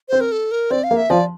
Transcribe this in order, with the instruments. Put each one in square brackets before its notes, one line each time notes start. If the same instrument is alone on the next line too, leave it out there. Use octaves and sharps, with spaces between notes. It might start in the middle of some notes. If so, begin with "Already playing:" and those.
[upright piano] C4 [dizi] C5
[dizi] A#4
A4
A#4
[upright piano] C4 [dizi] D5
[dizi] F5
[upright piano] A#3
[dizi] E5
[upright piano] F3 [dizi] D5